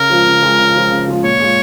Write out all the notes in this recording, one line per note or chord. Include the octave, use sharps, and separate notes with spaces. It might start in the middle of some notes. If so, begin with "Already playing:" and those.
Already playing: C#3 A#4
F3 G#3 F4
C#3
F3 G#3 F4
C#3
F3 G#3 F4
C#3
F3 G#3 F4
A#2 C#5
G#3 F4